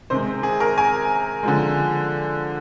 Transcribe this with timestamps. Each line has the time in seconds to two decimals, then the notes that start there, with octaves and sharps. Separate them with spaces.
0.10 C3 D#3 G#3 C5
0.43 G#4
0.60 A#4
0.78 G#5
1.43 D3 F3 G#3